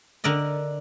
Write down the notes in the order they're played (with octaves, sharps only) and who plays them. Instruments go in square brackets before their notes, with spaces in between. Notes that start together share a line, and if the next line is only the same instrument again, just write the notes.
[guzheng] D3 A#4 D5 D#5